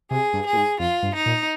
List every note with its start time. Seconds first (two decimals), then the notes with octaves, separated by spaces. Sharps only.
0.11 C3 G#4
0.33 G2
0.46 G#4
0.53 A#2
0.57 G#2
0.79 F2 F4
1.03 G2
1.15 D#4
1.26 A#2